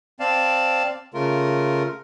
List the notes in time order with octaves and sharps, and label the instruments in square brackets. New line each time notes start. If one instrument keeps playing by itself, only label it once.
[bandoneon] C4 D5 F5 A5
C#3 A3 F4 A#4